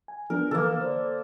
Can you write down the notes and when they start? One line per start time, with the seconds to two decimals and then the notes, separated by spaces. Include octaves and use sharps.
0.08 G#5
0.30 F3 B3 D4 A#4
0.51 D3 E3 A#3 A4 B4
0.81 C5 D5